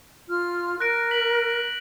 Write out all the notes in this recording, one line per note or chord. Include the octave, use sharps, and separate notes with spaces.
F4 F6
A#4 F#6 A#6 D7
B6 F#7